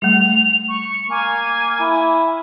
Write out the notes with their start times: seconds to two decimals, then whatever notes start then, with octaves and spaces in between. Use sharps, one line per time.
0.02 G3 A3 F7
0.68 C#6
1.10 A#3 G#5
1.80 E4